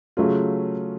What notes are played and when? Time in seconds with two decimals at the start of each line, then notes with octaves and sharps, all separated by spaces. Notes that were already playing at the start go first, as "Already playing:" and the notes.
0.17 C#3 F#3 A3 C#4 F4